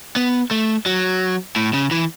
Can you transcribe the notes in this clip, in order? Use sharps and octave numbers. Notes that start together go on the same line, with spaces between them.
B3
A3
F#3
A2
C#3
E3